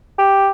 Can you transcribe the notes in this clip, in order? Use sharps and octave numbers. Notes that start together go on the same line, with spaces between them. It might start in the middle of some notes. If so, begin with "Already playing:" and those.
G4